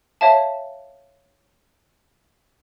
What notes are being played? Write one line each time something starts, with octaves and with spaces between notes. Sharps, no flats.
C#5 E5 F5 A5